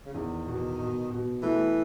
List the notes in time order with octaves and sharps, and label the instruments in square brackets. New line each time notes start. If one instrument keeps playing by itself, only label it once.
[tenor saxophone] C#3
[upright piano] E2 [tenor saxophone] D#3
[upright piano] B2
B2
B2
[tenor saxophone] E3 [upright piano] A3